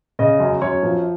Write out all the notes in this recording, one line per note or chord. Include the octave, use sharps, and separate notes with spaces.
C#3 D#5
F#2
F#2 C#5
F3